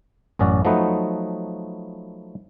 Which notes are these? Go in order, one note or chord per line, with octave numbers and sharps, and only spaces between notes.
A1 F#2 C#4 F#4 D5
F3 F#3 A3 B3 D#4 B4